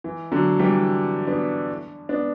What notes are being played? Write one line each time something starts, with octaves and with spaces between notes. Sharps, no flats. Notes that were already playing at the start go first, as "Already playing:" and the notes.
E3
D3 F#3
E3 G3
B3 D4
B3 D4